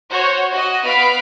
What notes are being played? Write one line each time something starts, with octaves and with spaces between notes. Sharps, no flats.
F#4 C5 C#5
F#4 D#5
B3 B4 F5 B5 B6 D7